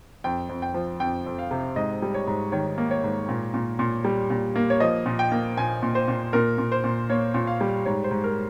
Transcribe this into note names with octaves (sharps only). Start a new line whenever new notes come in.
F2 G5
F2
G5
F3
F2 G5
F2
F5
C3
G#2 D#5
G3
C#5
G#2
D#3 C#5
A#3
C#5
G#2
A#2
A#2
A#2
G3
A#2
A#3
C#5
F3 D#5
A#2
G5
A#3
A#2 G#5
A#2
C5
A#2
A#2 A#4
A#2
C5
A#2
A#3 C#5
A#2
F5
G3
G#2 C#5
C5
G#2
A#4